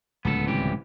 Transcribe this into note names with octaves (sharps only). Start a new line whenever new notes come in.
D1 C#2 B3 A4
C2 E3 G4